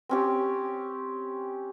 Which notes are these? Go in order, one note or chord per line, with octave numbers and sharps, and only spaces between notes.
C4 C#4 G4